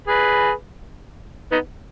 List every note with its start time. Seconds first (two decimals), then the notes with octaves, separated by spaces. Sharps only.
0.07 G#4 B4
1.52 B3 D#4